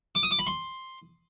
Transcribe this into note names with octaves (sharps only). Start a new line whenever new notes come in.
D6
D#6
D6
B5
C6